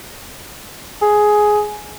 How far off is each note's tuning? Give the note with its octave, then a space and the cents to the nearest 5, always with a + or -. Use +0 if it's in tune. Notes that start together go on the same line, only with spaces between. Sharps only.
G#4 +10